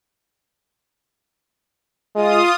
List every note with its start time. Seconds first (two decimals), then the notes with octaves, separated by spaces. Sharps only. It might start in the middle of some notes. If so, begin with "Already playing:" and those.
2.15 G#3 F4 D#6